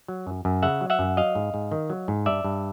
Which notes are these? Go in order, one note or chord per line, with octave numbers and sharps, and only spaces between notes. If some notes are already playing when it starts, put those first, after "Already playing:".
F#3
F#2
F#2
C#3 E5 F#5
F#3
E5 F#5
F#2
F#3 D#5 F5
G#2
G#2
D#3
F#3
G#2
G2 D5 E5
G2